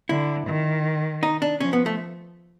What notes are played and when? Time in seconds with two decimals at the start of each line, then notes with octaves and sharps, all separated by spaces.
0.09 D3 E4
0.47 D#3
1.23 D#4
1.42 D4
1.60 F3 C#4
1.73 B3
1.86 A3